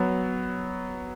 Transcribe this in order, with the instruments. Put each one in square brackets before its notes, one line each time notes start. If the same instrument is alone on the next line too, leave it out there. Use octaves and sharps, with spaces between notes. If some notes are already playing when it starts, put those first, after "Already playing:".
Already playing: [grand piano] F#3 B3